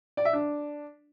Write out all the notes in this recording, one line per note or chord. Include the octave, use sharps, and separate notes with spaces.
D5
E5
D4